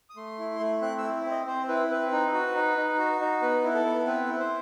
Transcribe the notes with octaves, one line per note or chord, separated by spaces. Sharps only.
D#6
A3 C6
E4
A3
C4 F#6
E6
E4
C4
D#5
C4 C5
E4 B4
C4 B4
D#4
F#4
D#4
D#4
F#4
D#4
B3 B4
E4
A4
B3
C4 B4
E4
C5